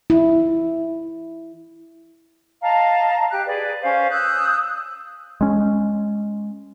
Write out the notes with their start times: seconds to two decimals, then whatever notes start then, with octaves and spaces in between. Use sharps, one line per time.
0.10 E4
2.62 D#5 F5 A5 A#5
3.31 G4 F#6
3.46 G#4 B4 D5
3.82 C#4 C5 F5
4.11 D#6 E6 F#6 G6
5.41 G#3 C#4